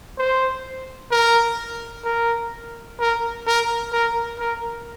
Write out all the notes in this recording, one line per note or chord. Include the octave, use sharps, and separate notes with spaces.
C5
A#4
A#4
A#4
A#4
A#4
A#4